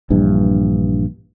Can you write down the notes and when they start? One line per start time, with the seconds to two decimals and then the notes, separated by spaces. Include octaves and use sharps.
0.10 A#1 G2 E3